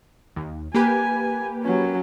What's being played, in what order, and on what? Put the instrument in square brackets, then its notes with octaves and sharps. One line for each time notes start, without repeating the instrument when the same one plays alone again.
[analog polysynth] D#2
[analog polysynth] A#3 G4 B4 [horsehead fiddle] G#5
[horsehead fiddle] F#3 C#4